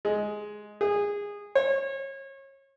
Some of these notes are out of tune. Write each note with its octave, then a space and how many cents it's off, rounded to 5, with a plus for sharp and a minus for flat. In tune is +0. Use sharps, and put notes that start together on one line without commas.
G#3 +10
G#4 -20
C#5 -30